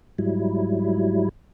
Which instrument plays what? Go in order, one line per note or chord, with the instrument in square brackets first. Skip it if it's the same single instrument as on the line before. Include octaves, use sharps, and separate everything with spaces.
[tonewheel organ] G#2 F#3 G3 E4